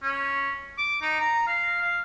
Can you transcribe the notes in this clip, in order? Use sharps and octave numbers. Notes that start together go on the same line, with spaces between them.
C#4
D6
D#4
A#5
F5
F5